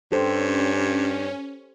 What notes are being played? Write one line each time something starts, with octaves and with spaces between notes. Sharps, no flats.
G2 C#4 G4 A4 C5